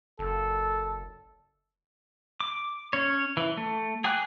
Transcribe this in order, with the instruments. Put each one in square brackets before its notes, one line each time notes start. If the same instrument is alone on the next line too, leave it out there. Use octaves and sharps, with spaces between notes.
[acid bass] F#1 [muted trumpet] A4
[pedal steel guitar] D6
C#4 C#5
E3
A3
G#4 G5 G#5 D6 F#6